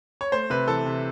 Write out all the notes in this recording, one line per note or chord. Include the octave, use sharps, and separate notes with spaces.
C#5
A3 C5
C3 B4
E3 A4
C3